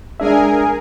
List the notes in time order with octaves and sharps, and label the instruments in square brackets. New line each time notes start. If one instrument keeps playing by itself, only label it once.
[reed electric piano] G#3 D4 E5 [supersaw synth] G#4 A#4 G#5